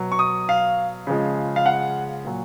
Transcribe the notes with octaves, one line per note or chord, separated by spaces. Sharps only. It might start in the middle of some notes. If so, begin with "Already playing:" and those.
Already playing: B2 F#3
C#6
D#6
F5
C#3 F3 G#3
F5
F#5
A#2 F#3